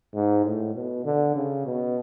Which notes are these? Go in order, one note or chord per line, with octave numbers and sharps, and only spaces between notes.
G#2
A2
B2
D3
C#3
B2